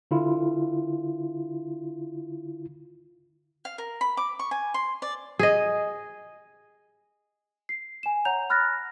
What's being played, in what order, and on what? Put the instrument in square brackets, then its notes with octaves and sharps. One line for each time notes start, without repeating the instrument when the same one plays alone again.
[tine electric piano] D3 E4 F4
[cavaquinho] F5
A#4
B5
D6
C#6
G#5
C6
D5
[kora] G#4 D#5
[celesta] C7
G#5 E7
C#5 F#5 A#5 G6 F7
B5 F6 F#6 A6 A#6